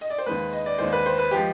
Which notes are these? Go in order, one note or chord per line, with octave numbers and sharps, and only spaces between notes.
D#5
D5
C5
D#2 D#3 G#3 B4
D#5
D5
D#2 D#3 G#3 C5
B4
C5
B4
F3 G#3 G4